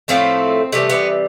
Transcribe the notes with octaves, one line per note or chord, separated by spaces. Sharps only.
A2 F3 A3 C4
C3 E3 G3 A3
B3